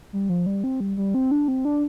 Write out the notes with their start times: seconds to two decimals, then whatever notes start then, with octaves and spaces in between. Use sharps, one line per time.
0.13 G3
0.29 F3
0.46 G3
0.64 C4
0.80 G3
0.97 G3
1.14 C4
1.31 D4
1.48 C4
1.65 D4